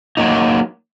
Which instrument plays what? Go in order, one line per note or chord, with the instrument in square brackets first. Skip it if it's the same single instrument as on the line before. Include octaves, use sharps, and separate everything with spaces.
[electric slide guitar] F#3 A#3 D#4